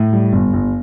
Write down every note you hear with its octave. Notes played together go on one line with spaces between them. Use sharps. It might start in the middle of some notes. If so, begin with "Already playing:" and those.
Already playing: A2
G3
G1
G1